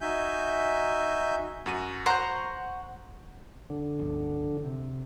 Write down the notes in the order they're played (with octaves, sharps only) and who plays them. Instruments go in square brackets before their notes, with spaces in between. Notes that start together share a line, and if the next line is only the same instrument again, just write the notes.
[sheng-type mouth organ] D#4 F#4 E5 G#5 G6
[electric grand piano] F#2 F#4 D#7
[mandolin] C5 F#5 A#5 [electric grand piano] C#6 G6
[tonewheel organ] D3
[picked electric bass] G1 C#2 F3
C3